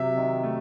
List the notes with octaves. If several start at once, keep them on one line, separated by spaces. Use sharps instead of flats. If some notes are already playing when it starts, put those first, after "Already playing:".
Already playing: C3 F#3 E5
D#3
A3